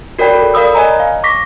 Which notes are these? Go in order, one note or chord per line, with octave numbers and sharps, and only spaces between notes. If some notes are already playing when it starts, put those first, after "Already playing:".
F#4 A#4 C#5 D5 G5 B5
A4
A#4 D5 F5 B5 D#6 E6
C#5 D#5 G#5 A#5
F5
C#6 D6 A#6 B6